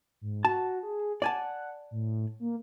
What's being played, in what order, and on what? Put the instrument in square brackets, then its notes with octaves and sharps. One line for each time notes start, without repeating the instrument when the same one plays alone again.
[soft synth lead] G#2
[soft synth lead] F#4 [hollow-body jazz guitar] A5
[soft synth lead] G#4
[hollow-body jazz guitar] D5 G#5 A5 [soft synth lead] F#5
[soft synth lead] A2
A#3